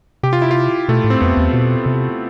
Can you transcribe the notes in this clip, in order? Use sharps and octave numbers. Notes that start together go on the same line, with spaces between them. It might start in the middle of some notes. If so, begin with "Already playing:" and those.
C3 G4
F4
E4
F4
B2 A3
A2
C4
F2 B3
E2
B2
C3